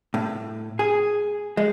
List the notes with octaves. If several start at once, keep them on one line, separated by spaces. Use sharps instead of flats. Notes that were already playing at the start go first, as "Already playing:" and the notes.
A2
G#4
G#3